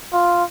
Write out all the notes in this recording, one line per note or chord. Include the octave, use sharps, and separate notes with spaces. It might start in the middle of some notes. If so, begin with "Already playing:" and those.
F4